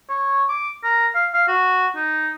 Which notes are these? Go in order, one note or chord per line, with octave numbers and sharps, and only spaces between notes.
C#5
D6
A#4
F5
F5
F#4
D#4